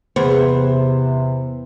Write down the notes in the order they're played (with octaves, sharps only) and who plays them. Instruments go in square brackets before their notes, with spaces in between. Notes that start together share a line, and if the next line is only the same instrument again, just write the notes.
[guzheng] E2 [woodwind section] C3 [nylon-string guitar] B3 [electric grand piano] C5